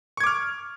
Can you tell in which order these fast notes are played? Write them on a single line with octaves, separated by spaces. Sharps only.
C#6 G#6 D6 F6